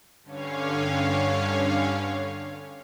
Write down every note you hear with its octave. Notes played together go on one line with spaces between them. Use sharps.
G2 D3 C#4 C#5 F5